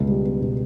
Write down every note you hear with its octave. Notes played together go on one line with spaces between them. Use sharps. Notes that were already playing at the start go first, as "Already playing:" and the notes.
Already playing: C#2 B2
G3
B3
B2